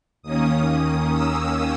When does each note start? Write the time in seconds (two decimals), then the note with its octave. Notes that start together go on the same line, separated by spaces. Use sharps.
0.22 D#2 D#3 A#3 C#4 D#6
1.12 E6